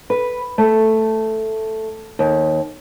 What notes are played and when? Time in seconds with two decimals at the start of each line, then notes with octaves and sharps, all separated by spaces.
0.10 B4
0.58 A3
2.19 D#2